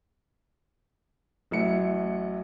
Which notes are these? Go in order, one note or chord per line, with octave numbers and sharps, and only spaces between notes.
A1 F#3 E4 C#7